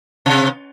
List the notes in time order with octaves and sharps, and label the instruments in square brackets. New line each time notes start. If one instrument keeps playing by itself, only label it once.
[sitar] C3